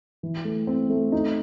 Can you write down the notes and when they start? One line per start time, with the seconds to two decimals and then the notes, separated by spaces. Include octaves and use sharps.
0.23 E3
0.45 A3
0.67 C4
0.90 A3
1.12 D#4